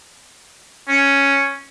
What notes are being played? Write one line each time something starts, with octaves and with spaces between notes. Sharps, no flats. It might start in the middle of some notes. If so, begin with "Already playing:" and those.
C#4